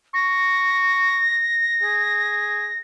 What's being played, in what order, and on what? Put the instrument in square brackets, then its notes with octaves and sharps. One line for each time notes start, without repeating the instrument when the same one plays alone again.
[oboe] C#6 [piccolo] A#6
[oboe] G#4